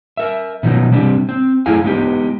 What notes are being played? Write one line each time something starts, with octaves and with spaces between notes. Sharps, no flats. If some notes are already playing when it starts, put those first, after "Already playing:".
A#4 E5
B2 D#3 F3 F#3
C3 G3 C4 D4 G4
C4
F#2 A3 E4 G#4 F5 G#5
G#3 B3 D#4 G4